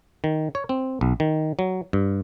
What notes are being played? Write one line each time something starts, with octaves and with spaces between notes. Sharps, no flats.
D#3
C#5
C4
B1
D#3
F#3
G2